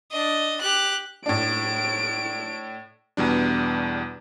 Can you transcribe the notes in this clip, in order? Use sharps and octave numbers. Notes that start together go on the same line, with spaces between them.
D4 D#5
G4 F#6
A2 D4 D7
E2 B2 G3 D4